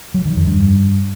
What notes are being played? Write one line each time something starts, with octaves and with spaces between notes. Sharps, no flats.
F#3
D#3
F2
G2